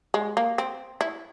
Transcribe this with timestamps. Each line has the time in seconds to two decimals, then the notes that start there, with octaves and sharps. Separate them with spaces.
0.14 G#3
0.37 A#3
0.58 C4
1.01 E4